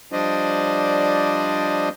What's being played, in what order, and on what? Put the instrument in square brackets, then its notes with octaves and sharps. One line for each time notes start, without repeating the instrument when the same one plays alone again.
[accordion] F3 G3 D4 C5 D5 D#5